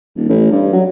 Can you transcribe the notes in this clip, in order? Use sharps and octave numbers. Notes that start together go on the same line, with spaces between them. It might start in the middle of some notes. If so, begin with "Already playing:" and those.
D#1
A1
G2
F#3